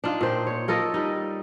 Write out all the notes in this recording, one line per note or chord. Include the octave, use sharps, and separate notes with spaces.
D4 D#4 F4
A#2 C5 G5
C#5
F4 A4 A#4 D#5
G3 D#4